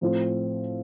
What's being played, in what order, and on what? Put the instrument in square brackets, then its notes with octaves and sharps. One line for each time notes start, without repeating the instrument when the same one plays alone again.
[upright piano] A2 F3 A3 C4 F4